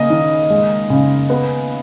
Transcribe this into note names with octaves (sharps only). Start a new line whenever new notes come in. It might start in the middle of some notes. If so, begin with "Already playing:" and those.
Already playing: C#3 A#3 D#5
D#3
G#3
C#3
B3